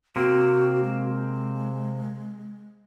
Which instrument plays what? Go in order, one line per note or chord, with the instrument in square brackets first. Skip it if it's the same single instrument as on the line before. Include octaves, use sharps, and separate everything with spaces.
[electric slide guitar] C3 A#3 C4 [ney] F#4
[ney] G#3